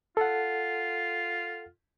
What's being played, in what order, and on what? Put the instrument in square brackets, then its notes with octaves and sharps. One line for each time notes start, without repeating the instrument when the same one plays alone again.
[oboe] F4 [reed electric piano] A4 F#5